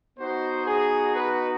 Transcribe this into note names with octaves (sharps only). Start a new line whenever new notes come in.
B3 D#4 F#4 C5
G#4
B4